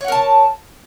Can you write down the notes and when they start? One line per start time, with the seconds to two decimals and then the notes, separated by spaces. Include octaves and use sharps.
0.01 C#5
0.04 F#5
0.08 A#4
0.12 A5